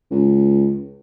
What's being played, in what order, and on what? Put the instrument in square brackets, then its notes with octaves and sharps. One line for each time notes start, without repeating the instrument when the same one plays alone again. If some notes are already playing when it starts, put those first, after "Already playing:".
[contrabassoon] C#2